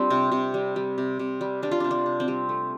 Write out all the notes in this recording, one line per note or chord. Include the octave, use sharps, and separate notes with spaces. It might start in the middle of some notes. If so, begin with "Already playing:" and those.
Already playing: G3 C4 D4 F4
C3
C3
G3
G3
C3
C3
G3
G3 D4
F4
C3 D4
D4
C3
C4
G3
A3